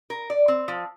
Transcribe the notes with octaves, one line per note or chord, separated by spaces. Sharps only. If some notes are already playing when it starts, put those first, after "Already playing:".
A#4
D5
C4
F3